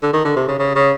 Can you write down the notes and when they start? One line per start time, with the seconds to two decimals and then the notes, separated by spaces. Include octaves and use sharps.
0.02 D3
0.13 D#3
0.25 D3
0.36 C3
0.48 C#3
0.59 C#3
0.75 C#3